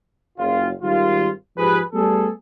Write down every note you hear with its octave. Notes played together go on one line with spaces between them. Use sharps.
F#1 F4
G#1 D#3 G3 F4
G#2 F3 G4 G#4 B4
G3 A3 B3 G#4 A4